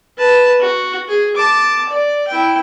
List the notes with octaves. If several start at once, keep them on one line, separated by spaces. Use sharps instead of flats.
B4 A5
F#4
G#4
A5 D6
D5
E4 G5